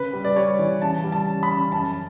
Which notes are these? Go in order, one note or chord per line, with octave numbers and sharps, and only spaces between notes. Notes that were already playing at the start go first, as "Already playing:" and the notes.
Already playing: C#3 B4
G3
D5
G3 C#5
E3
C#3 A5
G3
A5
C#4
B5
C#4
F#2 A5